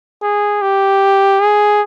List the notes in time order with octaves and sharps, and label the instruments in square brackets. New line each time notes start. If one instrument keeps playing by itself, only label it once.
[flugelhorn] G#4
G4
G#4